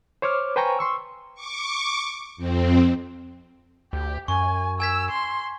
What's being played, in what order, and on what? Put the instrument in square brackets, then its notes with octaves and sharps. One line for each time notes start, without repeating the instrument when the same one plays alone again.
[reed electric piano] C5 C#5 D6 F6
B4 C5 G5 G#5 A#5 C#6
C6 C#6 E6
[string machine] C#6 D6
F2 C4
[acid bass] D2 [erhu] G4
[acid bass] F#2 [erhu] G#5 [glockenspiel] C#6
[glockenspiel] G#5 G#6 B6 [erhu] E6
[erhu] C6